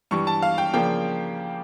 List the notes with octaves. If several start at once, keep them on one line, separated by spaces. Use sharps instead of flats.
G2 E3 G3 C#6
A5
F5
G5
C#3 F3 A#3 D4 G5